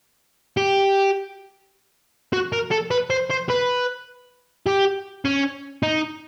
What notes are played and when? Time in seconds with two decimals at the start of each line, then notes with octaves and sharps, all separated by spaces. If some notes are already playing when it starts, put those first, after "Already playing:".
0.57 G4
2.33 F#4
2.53 A#4
2.71 A4
2.91 B4
3.10 C5
3.30 C5
3.49 B4
4.66 G4
5.25 C#4
5.83 D#4